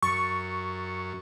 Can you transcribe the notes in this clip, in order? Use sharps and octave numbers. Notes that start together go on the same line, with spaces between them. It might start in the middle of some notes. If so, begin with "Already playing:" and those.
F#2 C#6 A6 C#7